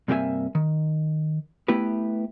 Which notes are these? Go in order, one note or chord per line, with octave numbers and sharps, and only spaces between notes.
G2 C3 A#3 G4 E5 G#5
D#3
A3 B3 E4 G4 B4